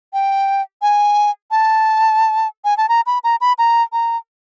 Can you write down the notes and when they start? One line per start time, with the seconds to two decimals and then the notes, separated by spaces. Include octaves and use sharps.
0.13 G5
0.82 G#5
1.51 A5
2.65 G#5
2.77 A5
2.89 A#5
3.07 B5
3.24 A#5
3.41 B5
3.58 A#5
3.93 A#5